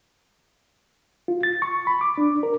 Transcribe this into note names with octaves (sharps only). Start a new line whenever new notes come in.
F4
A6
C#6
B5
D6
D4
A#4